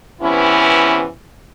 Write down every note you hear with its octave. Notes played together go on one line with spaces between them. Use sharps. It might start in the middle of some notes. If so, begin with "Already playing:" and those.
C3 E3 B3 C#4 E4